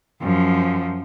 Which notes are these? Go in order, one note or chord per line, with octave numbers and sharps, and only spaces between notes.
F#2 F3